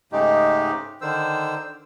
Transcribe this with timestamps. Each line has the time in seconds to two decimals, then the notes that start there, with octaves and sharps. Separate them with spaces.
0.12 G#2 C#3 G#3 A3 D#4 G4
1.01 D3 D#3 C5 E6